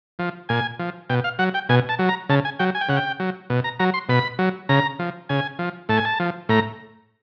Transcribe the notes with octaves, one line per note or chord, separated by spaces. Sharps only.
F3
A#2 G#5
F3
B2 G5
F5
F#3 F#5
G5
B2 G#5
A5
F#3
A#5
C#3 A5
G#5
F#3 G5
G#5
G5
C#3 F#5
G5
F#3
B2
A#5
F#3 A#5
C6
B2 B5
F#3
C#3 A#5
F3
C#3 G#5
F3
A2 A5
G#5
A5
F3
A2 A#5